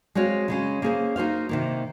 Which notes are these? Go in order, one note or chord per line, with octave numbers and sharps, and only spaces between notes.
G#3 C4 F#4 C#5 F5
C#3 G#3 C#4
A#3 C#4 G#4 C5
A#3 D#4 F#4 C5 F5
C3 D#3 A#3